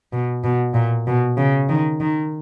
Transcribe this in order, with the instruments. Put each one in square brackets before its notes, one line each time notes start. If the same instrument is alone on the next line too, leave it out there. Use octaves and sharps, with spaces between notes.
[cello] B2
B2
A#2
B2
C#3
D#3
D#3